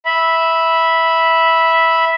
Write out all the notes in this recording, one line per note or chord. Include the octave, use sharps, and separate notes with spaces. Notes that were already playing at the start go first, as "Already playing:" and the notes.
E5 B5